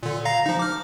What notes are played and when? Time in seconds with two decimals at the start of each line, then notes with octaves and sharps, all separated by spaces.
0.03 A#2 D3
0.25 F5 A#5 A#6
0.46 F3 D#4
0.59 D6 F6